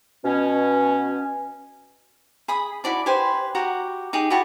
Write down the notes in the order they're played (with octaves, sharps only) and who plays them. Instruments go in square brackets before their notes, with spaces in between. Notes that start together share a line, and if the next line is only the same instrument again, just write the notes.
[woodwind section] B2 C#4
[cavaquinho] G#4 B5 D#6
E4 F#4 D5 A5
G4 B4 C5 G#5
F#4 G4 F#5 A#5
D#4 G4 G#4
E4 F#4 G4 A5